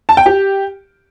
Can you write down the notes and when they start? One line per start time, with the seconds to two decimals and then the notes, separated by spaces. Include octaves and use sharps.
0.09 A5
0.17 G5
0.26 G4